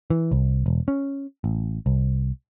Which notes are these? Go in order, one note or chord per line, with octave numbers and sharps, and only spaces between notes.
E3
C2
E1
C#4
A1
C2